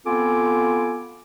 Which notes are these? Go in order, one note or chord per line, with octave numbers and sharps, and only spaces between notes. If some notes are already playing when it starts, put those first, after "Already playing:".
B3 C4 F4 A4 G#5 D6